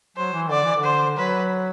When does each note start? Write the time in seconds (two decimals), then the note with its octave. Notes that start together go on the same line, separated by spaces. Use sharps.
0.17 F#3 C5
0.33 E3
0.50 D3 D5
0.63 E3
0.76 D3
0.84 C5
1.17 F#3 B4